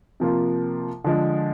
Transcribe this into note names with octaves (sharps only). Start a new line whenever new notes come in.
C3 F3 A#3 F4
D3 F3 G#3